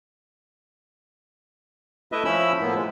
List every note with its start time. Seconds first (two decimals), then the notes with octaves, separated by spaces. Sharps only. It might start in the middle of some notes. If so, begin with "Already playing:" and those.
2.12 A3 E4 B4 D#5 E5
2.25 F3 C#4 E4 B5 E6
2.61 A2 F3 A#3 B3
2.75 G#3